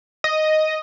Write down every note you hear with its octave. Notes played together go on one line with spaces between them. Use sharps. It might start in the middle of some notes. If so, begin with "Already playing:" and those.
D#5